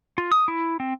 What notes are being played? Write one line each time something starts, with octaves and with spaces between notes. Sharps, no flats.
F4
D#6
E4
C4